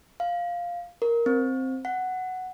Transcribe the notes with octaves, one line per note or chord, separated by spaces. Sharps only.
F5
A#4
C4
F#5